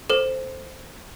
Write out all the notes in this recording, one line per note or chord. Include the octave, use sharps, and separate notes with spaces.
A4 C5